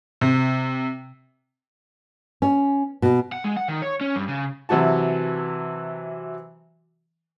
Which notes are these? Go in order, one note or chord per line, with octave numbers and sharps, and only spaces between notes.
C3
C#4
B2
F#5
G#3
F#5
D#3
C#5
C#4
G2
C#3
C3 E3 F#3 F#4 A5